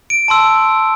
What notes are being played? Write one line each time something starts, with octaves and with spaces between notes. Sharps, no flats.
D7
A5 C6 E6